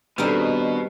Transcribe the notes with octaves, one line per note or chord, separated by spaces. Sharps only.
B2 D#3 G3 C4 D4 D#4 G#4 F6